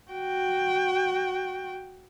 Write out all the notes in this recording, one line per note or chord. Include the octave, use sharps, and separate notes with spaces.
F#4 G5